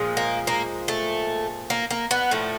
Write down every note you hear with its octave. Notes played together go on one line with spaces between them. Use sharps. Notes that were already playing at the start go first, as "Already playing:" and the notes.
Already playing: A#2 F3 G#3
A#3
A#3
A3
A#3
A#3
B3
A2 F3 A3